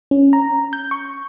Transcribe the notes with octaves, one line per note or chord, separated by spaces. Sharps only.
C#4
A#5
G6
C#6